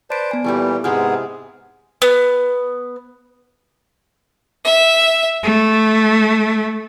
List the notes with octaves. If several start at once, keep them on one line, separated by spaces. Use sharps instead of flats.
B4 C5 D5 A5 D7
B3 G#5
A#2 E3 G3 A3 E4 G4
G#2 C3 G#3 B3 C4 G#4 F6
B3
E5
A3